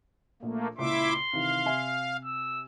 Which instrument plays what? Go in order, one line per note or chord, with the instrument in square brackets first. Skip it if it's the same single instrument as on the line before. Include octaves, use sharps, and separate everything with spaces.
[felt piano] A#1 [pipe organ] A3 A#3
[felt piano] C#2 A#2 [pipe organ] E4 E5 D6 [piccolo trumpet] C6
[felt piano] C3 D#3 E3 [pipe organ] F5
[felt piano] C3 E5 G#5
[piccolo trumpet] E6